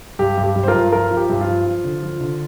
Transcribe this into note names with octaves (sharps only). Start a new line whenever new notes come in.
G2 G4
G2
G4
G2
C5
F4 A#4
G2
F3 F4 A#4
F3
G4
G2
F4
F3
F3
D3
F3
D3